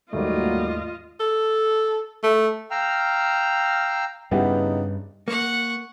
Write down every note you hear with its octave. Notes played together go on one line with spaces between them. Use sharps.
D#2 G#2 F#3 G3 A3 A#3 F4 D#5
A4
A3
F5 G5 A#5 E6 F6
G2 C#3 G3 B3 D#4 E4 G4
A#3 F#5 C#6